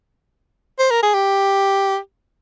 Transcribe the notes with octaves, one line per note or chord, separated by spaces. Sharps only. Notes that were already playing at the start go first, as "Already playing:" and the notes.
C5
A#4
G#4
G4